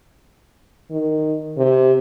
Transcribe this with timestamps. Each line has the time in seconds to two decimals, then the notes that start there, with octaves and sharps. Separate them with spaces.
0.90 D#3
1.57 C3